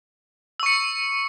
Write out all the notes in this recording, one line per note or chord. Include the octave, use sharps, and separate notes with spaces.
C#6 E6 C#7